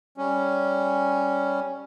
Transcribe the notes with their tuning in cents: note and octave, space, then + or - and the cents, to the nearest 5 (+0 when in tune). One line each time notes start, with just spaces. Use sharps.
G3 +0 C#4 +0